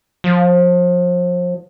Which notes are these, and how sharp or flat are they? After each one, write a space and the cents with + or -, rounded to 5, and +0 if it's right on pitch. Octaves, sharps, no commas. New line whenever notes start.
F3 +30